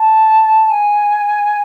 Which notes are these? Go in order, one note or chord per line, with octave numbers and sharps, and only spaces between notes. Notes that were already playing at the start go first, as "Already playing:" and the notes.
Already playing: A5
G#5